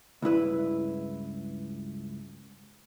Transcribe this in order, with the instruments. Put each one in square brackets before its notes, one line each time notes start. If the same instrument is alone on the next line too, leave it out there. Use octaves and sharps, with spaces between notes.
[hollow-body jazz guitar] C#2 G2 E4 B4